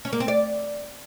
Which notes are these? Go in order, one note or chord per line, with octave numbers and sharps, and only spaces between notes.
C#4
A#3
C4
D5